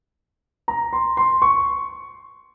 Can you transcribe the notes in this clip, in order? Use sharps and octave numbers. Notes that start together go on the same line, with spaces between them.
A#5
C6
C6
C#6